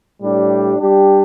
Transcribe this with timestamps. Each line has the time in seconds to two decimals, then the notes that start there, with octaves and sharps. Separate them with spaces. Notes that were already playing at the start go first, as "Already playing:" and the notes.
0.22 A2 G3 D4 G4
0.80 G3 D4 G4